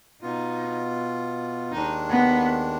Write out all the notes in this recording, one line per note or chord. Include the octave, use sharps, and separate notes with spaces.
B2 B3 D#4 F4
D#2 D#3 G#3 D4 D#4
B3